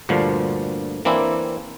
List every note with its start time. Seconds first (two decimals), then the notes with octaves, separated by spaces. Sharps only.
0.09 D2 G2 A#2 D3 F3
1.05 E3 A#3 C4 D4 E4